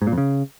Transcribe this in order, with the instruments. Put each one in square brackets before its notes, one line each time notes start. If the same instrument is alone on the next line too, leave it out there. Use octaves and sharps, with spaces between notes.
[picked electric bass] G#2
A#2
F2
C#3